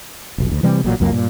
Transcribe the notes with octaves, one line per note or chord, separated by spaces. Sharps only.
F1 B1
D2
C3 E3 G3 C4
A1 A#2 F#3
C2 F2 F#3 A#3
G2 A#2